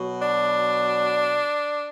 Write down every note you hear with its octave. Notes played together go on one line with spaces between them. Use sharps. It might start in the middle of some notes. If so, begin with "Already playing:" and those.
Already playing: B2 F#3
D4